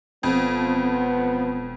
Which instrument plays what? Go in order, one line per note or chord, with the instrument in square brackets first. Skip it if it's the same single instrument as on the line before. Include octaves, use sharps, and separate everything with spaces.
[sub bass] E1 [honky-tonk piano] F2 [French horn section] F3 B3